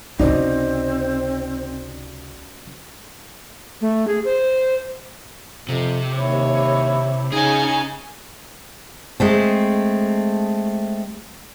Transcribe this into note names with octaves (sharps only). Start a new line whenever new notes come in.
C#2 C3 C4 C#4 D#4 F#4 D5
A3
G#4
C5
F2 C3
D#2 E4 C#5
C#3 C#4 D#4 G#4 G#5
G#3 A3 C4